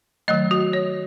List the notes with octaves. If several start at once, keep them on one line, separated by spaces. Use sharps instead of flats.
D#3 F#3 A3 D#5
F#4
C#5